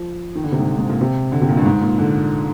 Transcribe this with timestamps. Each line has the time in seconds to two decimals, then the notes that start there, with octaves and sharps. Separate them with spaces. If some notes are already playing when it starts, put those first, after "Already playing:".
Already playing: F3
0.35 D#3
0.44 D3
0.52 C3
0.59 G#2
0.78 G#2
0.89 A#2
1.01 C3
1.32 D3
1.41 C3
1.49 A#2
1.57 G2
1.66 G#2
1.82 A#2
1.98 D3